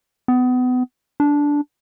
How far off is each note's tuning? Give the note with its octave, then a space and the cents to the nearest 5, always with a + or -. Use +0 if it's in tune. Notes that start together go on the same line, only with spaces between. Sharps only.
B3 +30
D4 -10